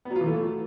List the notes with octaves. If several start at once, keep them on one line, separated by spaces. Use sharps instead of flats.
B3
F#3
F4
E3
A3